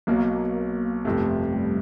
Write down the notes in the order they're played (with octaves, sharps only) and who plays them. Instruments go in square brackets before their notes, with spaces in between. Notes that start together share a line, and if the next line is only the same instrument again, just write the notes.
[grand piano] B1 B2 F#3 [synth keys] A#3
[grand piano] G1 F2 C3 [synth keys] A3
[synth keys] G3